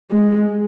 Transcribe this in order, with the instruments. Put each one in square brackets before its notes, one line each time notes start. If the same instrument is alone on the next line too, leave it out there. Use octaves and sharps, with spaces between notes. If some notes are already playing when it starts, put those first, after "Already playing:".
[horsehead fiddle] G#3